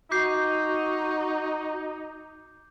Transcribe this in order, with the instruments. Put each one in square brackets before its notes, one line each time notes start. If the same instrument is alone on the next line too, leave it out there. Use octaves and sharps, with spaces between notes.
[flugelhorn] D#4 [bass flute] F#4 [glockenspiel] D6 G6 C7